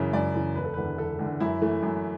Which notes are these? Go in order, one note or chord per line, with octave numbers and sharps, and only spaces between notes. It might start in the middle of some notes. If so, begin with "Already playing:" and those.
Already playing: F#2 C#3 E3
F#2 D5
C#3 E3
E1 B4
A4
B4
E2 D3
E1 A4
E2 D3
F#2 E4
E3 A3
F#2